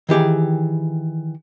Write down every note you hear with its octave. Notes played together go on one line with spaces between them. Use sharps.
D#3 E3 G4 G#4